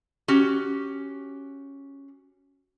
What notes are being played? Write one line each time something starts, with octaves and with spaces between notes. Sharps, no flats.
C#4 F#4 G4